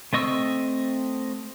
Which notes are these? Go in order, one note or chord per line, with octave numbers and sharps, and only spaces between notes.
A3 C4 D#5 C#6 E6